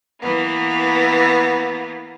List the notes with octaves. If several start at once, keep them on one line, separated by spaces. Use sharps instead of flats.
E3 A#3 B3